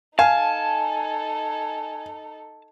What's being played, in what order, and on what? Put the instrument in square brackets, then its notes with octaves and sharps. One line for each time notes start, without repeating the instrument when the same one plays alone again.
[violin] D#4 A4 [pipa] F5 [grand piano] G#5 [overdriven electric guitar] A5